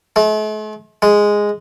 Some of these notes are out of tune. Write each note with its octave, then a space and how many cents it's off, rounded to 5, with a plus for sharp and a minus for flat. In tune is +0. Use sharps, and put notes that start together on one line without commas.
A3 -45
G#3 -5